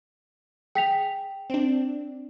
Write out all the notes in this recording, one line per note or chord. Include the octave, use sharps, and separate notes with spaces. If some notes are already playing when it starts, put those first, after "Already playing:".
G#4 G5 B6 F7
C4 D4